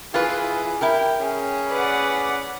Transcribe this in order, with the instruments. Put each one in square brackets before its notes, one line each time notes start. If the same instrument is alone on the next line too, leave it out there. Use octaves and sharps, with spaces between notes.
[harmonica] E3 G#4 [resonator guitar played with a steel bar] F4 B4
[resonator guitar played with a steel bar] E4 G4 A#4 [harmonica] G5
[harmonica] C#4 G#4
[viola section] B4 D5 F#5